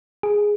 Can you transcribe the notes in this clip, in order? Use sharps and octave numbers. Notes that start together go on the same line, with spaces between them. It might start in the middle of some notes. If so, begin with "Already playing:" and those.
G#4